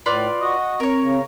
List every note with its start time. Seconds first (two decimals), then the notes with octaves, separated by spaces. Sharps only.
0.06 A2 F4 B4 D5
0.41 F#4 D#5
0.80 C4 A#4 C#5
1.02 C#3